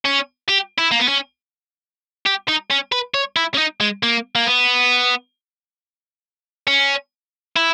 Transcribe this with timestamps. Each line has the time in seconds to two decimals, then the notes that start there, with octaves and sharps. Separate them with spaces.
0.05 C#4
0.49 G4
0.79 E4
0.91 A#3
1.00 B3
1.08 C#4
2.26 G4
2.48 D#4
2.70 C#4
2.92 B4
3.14 C#5
3.36 E4
3.54 C#4
3.58 D#4
3.80 G#3
4.03 A#3
4.36 A#3
4.47 B3
6.67 C#4
7.56 E4